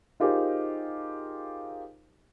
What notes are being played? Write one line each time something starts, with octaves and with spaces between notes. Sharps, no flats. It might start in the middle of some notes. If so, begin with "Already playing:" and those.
D#4 F4 G4 G#4 A#4 C5